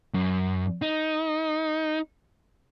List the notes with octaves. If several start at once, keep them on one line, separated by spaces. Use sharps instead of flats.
F#2
D#4